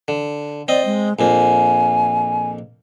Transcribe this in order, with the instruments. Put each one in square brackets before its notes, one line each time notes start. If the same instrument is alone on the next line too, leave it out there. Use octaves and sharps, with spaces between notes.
[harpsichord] D3
[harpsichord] C4 D#5 [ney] D5
[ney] G#3
[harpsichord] A#1 F2 A#3 [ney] G#5